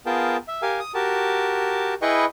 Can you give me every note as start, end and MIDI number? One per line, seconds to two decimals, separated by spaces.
0.06 0.37 59
0.06 0.37 65
0.06 0.37 68
0.06 0.37 70
0.06 0.37 79
0.06 0.37 81
0.48 0.62 76
0.62 0.80 67
0.62 0.80 70
0.62 0.80 77
0.62 0.80 80
0.80 0.92 87
0.94 1.94 66
0.94 1.94 67
0.94 1.94 70
0.94 1.94 81
2.02 2.25 64
2.02 2.25 68
2.02 2.25 71
2.02 2.25 75
2.02 2.25 79
2.02 2.25 85